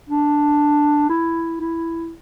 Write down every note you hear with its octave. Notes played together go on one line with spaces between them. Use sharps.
D4
E4
E4